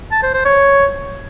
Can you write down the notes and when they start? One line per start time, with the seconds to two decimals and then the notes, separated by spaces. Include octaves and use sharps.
0.12 A5
0.23 C5
0.34 C5
0.45 C#5